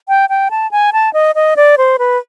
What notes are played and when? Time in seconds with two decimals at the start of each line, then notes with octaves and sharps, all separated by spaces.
0.08 G5
0.29 G5
0.51 A5
0.71 G#5
0.93 A5
1.14 D#5
1.35 D#5
1.57 D5
1.78 C5
1.99 B4